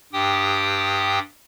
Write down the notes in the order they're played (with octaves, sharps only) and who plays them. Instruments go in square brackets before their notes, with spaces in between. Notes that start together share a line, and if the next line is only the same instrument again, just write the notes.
[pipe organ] G2 G4 G5 D#6